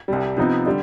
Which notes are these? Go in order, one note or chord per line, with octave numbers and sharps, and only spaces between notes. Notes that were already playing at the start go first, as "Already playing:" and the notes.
C2 C3 G3
C3 F3 B3 D#4
D3 G3